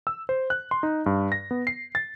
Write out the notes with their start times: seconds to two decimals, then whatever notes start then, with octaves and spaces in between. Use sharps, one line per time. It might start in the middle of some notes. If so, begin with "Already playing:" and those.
0.07 E6
0.29 C5
0.50 F#6
0.71 C6
0.83 D#4
1.06 G2
1.32 A#6
1.51 B3
1.67 C7
1.95 A6